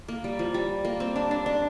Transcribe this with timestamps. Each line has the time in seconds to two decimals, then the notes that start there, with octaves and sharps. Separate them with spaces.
0.08 A#3
0.24 G3
0.39 F3
0.54 G3
0.85 A#3
1.00 C4
1.16 D4
1.31 D4
1.46 D4